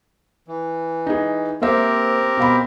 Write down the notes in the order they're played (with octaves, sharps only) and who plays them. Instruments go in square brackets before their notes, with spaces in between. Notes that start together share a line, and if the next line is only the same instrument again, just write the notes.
[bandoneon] E3
[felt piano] D#4 G#4
[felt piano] A#3 C5 E5 [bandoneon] C4 G4 A#4
[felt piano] B2 F5 B5